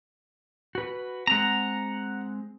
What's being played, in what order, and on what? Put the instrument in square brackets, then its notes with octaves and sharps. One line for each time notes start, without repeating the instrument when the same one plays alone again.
[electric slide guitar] F#4 B4
[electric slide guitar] G#3 C4 [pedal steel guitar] F#5 A#5